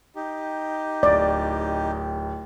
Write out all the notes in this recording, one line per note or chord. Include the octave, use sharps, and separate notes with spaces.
D#4 G4
D1 D5